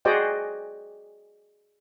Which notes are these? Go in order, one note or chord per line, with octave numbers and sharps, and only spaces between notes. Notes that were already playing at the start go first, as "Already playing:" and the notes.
F#4 G#4 C5 D5 D#5 G5